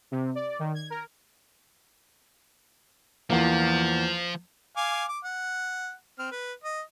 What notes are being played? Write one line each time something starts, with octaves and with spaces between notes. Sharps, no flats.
C3
D5
D#3
G#6
A#4
E2 F3 A#3
F5 G#5 D6
D6
F#5
C4 F6
B4
D#5